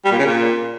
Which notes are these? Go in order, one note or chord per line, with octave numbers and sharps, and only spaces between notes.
G3
A#2
C#3
A#2